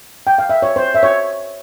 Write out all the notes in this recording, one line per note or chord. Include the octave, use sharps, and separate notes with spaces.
G5
F5
E5
C#5
C5
E5
C#5